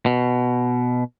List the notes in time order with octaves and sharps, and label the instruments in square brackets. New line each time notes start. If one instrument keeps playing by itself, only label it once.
[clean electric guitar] B2